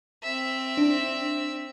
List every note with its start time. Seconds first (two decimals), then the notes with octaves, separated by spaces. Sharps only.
0.23 C4 E5
0.77 D4